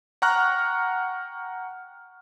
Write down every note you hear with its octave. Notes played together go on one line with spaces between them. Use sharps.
F#5 G5 A#5 C#6 F6 F#6